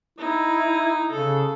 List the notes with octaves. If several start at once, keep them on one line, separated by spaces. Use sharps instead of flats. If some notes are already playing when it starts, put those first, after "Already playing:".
D#4 E4
C#3 A4